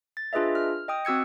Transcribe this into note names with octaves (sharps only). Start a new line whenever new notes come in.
A6
D4 F4 G#4 B4 D#5 E5
F6
D#5 G5 D#6
C4 F#4 E6 G#6 C#7